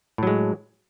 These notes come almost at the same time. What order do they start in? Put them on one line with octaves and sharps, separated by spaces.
A2 F#3 G#3